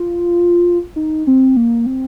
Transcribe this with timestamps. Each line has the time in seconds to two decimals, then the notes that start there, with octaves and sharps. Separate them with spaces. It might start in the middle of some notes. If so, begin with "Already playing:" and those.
Already playing: F4
0.96 D#4
1.27 C4
1.57 A#3
1.86 C4